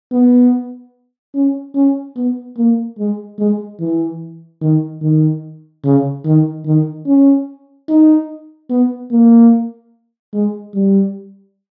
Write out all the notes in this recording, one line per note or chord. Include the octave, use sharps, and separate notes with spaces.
B3
C#4
C#4
B3
A#3
G#3
G#3
E3
D#3
D#3
C#3
D#3
D#3
C#4
D#4
B3
A#3
G#3
G3